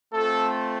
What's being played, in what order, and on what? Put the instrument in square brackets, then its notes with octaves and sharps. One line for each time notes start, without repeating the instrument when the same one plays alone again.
[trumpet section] A3 C4 F4 A4